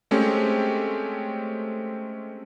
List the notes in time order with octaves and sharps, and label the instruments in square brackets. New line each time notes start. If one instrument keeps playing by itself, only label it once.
[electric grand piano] G#3 A3 C4 C#4 G4